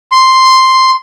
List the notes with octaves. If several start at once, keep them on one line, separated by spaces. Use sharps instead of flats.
C6